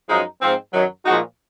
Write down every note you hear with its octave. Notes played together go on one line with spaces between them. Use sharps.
F#2 F3 G#3 D#4
G#2 F3 C4
F#2 D#3 F#3
A#2 F3 G#3 D#4 F#4